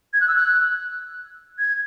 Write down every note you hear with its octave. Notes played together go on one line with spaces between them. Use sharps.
G#6
F#6
E6
F#6
G#6